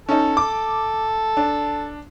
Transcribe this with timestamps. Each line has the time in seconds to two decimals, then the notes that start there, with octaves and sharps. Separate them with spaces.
0.09 C#4 D#4 A4
0.37 D6
1.37 D4